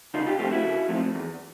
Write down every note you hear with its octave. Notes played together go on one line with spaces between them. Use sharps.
C#3 D#4 F4
F4 G4
F3 A3 C4 F4 G4
E4 F#4
C#3
F3 A3 C4
E2